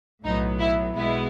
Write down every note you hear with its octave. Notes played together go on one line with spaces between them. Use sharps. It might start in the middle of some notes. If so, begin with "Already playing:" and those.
B1 A2 F#3 B3 D#4
E4
B1 B2 G#3 B3 E4